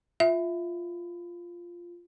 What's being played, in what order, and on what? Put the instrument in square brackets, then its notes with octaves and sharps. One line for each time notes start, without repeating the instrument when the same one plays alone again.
[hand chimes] F4 [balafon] E5